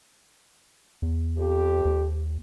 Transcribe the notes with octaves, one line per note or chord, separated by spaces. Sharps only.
E2
F2 G4
D#2